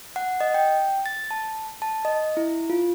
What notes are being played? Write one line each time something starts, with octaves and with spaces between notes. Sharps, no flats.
F#5
D#5
G5
A6
A5
A5
D#5
E4
F4